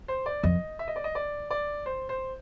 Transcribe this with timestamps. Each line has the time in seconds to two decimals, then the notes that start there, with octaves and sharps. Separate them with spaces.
0.08 C5
0.26 D5
0.43 F2 D#5
0.79 E5
0.88 D#5
0.96 D5
1.04 D#5
1.15 D5
1.50 D5
1.86 C5
2.09 C5